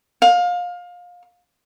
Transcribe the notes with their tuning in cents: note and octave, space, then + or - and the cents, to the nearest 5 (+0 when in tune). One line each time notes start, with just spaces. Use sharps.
F5 +25